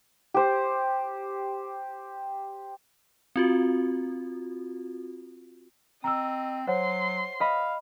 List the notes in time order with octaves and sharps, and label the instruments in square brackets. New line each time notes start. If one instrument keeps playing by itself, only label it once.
[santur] G4 C5
[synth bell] C4 F4 F#4
[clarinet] C4 [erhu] D#5 [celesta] A#5 E6
[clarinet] F#3 [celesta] C5 C#5 F#5 [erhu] C6
[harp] D#5 B5 [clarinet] F5